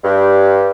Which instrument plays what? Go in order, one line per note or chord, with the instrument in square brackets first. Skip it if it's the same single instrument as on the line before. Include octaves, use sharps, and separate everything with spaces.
[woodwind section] G2